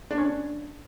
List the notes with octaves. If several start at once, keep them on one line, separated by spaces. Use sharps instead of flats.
D4
C#4
D4